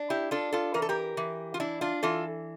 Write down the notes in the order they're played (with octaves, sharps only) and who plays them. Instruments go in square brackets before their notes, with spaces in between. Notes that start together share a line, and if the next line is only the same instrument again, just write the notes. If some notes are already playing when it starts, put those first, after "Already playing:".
Already playing: [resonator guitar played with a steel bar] D4
E4 G4
D4 F4 A4
F4 A4
E3 A#4
A4
G4 A#4
E3
F4
D4 E4
D4 F4
E3 F4 A4